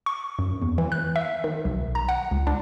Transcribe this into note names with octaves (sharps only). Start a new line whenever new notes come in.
C#6
F#2
E2
E3
F#6
E5
D#3
B1
A#5
F#5
C#2
D4